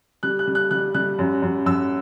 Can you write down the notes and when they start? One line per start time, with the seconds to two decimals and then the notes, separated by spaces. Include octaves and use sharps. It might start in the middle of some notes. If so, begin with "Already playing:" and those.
0.23 G3 F#6
0.39 F#6
0.47 G3
0.55 F#6
0.71 G3 F#6
0.94 G3 F#6
1.19 F#2
1.42 F#2
1.66 F#2 E6